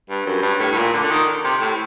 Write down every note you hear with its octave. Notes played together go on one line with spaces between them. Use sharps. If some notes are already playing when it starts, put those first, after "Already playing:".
G2
F#2
G2
A2
A2
A#2
D3
D3
D#3
C3
A2